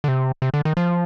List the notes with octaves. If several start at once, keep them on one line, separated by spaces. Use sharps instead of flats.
D3
C3
C3
D3
D#3
F3